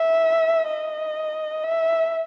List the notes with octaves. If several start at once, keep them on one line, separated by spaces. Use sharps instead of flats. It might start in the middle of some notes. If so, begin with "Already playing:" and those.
Already playing: E5
D#5
E5